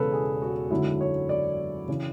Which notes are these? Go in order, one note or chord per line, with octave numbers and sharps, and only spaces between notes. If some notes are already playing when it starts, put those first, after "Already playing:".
Already playing: E1 E2 C#3 A4 B4
G#4
F#4
G#1 F#2 D3 F#3 E4
C#5
D5
C#3 E3